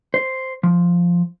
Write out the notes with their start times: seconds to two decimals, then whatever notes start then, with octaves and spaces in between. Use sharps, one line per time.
0.14 C5
0.63 F3